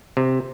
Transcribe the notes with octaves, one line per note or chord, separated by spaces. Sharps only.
C3